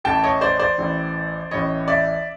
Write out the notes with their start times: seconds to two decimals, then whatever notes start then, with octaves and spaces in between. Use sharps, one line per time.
0.04 A1 A2 E3 G5 A5
0.23 C#5 D#5
0.41 C5 D5
0.59 C5 D5
0.78 A1 A2 E3
1.51 A1 A2 E3 C#5 D#5
1.88 D5 E5